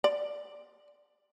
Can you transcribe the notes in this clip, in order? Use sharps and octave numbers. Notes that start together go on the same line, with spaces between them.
D5